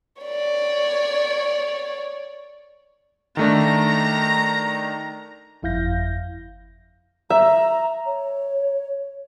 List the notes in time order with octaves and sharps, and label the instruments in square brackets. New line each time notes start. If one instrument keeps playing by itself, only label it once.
[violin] C#5 D5
[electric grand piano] D#3 A3 D4 [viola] A#5
[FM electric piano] G1 F2 E4 F5 G6 A#6
[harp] E5 [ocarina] A#5
[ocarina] C#5